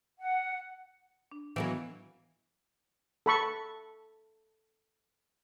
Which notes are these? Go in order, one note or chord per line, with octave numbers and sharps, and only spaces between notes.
F#5
D4
D#3 E3 F#3 A#3 B3
A4 B5 C#6